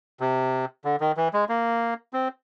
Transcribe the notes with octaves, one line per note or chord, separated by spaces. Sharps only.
C3
D3
D#3
E3
G#3
A#3
C4